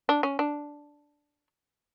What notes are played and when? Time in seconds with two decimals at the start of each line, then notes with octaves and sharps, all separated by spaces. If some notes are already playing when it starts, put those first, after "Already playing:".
0.09 D4
0.23 C#4
0.39 D4